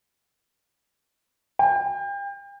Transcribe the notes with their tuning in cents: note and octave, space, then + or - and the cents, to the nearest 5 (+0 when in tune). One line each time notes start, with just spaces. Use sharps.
G5 +35